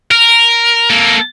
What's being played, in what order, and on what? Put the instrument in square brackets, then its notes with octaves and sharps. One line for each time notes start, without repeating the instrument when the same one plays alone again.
[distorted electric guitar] A#4
A#3 A4